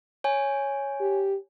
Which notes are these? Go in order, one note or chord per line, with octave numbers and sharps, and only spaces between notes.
C#5 G#5
G4